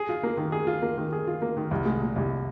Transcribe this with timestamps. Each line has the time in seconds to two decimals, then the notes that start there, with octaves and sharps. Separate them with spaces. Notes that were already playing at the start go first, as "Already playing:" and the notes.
Already playing: G#4
0.09 F4
0.23 A#3
0.37 D#3
0.52 G#4
0.67 F4
0.82 A#3
0.97 D#3
1.12 G#4
1.27 F4
1.42 A#3
1.57 D#3
1.71 C2
1.86 G#3
2.01 A#2
2.16 C2